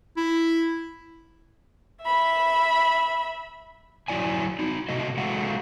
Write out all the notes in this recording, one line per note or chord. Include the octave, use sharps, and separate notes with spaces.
E4
E5 B5
F#3 E4 D5 G#5
D#4 F#4
C3 A3 F#4 D#5
G#3 A3 F#4 A4 F5 F#5